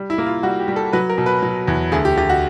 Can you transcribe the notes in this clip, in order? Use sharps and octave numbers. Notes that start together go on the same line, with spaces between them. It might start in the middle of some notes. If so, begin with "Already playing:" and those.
Already playing: G3
E4
A#3
F4
G3 F#4
G4
G3
A4
F#3 B4
A#4
B2
B4
F#3
E2
D2 G#4
G4
D2 G4
F#4